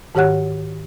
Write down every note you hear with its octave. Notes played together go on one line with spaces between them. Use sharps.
G#2 D#3 G4 C#5 F#5 F#6